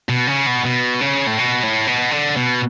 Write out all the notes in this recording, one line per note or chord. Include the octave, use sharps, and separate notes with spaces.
B2
C#3
B2
B2
C#3
A2
B2
A2
B2
D3
B2